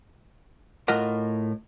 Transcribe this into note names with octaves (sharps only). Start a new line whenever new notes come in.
A2 F4 A#4 D#5 F#5